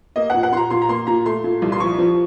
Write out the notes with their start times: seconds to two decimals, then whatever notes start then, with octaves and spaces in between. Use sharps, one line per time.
0.16 A#3 D#5
0.30 A#2 F#5
0.43 F#5
0.52 A#2 C6
0.57 A#5
0.70 A#2 C6
0.82 A#5
0.89 A#3 C6
1.07 A#2 A#5
1.26 A3 C6
1.44 A#2
1.62 C2
1.72 C6
1.80 F3 C#6
1.99 F3